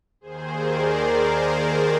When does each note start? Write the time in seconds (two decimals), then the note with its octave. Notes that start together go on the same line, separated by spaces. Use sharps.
0.21 D#2 D#3 G#4 C5
0.52 A#4 D5